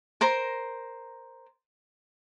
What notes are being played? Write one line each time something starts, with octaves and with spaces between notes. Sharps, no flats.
A#4 C5 A#5